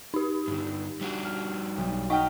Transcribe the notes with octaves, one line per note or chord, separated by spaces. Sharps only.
D#4 G4
G2 D3
G3 D4 F#4
F6
B1
D#4 D#5 F#5 G5 C#6 F6